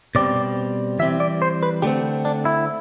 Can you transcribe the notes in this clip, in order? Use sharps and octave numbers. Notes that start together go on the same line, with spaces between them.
B2 G3 C4 D5
E3 G3 C4 E5
D5
C5
B4
D3 A3 C4 G4
D4
E4